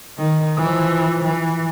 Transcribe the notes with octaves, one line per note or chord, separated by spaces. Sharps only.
D#3
E3 F3
E3